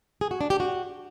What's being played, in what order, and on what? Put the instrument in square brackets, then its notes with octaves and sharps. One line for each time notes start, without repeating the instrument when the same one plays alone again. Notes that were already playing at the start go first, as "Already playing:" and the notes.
[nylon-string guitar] G#4
F#4
D4
G4
F#4